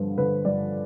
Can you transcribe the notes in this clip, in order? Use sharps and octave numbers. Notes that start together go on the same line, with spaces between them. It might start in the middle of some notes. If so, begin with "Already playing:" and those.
Already playing: G2 D3 F3 B4
D3 B4
G2 D5